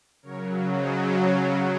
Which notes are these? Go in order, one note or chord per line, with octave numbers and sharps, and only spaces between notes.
C#3 F#3 A#4 C#5
C5 D#5
C#5 F5